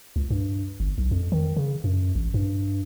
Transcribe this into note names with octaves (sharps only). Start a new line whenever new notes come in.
C#2
G2
G1
B1
F2
D#3
C#3
F#2
A1
G2